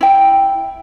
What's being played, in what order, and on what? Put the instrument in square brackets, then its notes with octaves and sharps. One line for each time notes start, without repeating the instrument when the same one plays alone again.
[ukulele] E4 G5